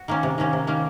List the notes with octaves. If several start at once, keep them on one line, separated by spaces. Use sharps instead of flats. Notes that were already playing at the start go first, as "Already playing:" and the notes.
Already playing: F#4
D#3 A#3 C#4
C3
D#3 A#3 C#4
C3
D#3 A#3 C#4